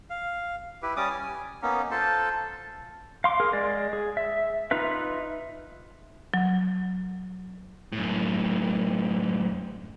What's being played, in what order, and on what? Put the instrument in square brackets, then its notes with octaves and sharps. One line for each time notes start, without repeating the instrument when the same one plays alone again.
[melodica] F5
E4 G4 B4
G3 C#4 D6 D#6
G#5
A#3 B3 C#4 D#4
F4 A4 C5 A5
[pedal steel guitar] F5 C6 D6
G#4 A#4
G#3 D5
G#4
E5
D#4 F4 B4 E5
[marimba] F#3
[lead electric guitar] F#2 A2